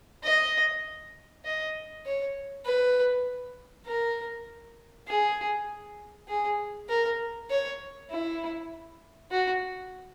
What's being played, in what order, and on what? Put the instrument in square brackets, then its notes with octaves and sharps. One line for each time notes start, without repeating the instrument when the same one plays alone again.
[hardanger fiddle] D#5
D#5
C#5
B4
A#4
G#4
G#4
A#4
C#5
E4
F#4